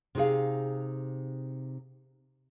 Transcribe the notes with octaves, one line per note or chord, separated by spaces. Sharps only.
C3 D#4 G#4 F5